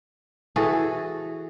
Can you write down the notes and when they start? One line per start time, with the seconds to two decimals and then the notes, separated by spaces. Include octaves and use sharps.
0.56 E3 F#4 G#4 A4